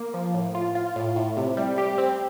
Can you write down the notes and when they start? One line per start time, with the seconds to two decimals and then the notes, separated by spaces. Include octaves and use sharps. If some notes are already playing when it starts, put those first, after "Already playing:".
Already playing: A#3
0.14 F3
0.34 A2
0.55 F4
0.75 F4
0.96 A2
1.16 A2
1.37 C3
1.57 G3
1.78 G4
1.98 C4